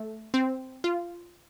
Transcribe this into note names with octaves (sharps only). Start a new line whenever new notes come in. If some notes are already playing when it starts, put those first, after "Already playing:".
Already playing: A3
C4
F4